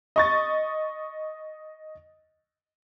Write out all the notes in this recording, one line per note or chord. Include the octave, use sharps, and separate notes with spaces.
D#5 C#6 A6